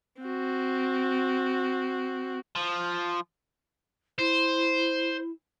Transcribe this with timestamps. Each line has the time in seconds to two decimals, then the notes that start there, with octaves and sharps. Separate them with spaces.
0.21 C4 F#4
2.56 F3
4.18 E4 C5